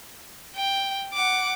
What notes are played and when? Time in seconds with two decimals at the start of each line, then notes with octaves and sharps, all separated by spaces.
0.56 G5
1.14 F#5 D6